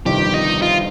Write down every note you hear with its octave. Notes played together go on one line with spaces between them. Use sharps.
G1 F2 C3 D#3 G4
D#4
F4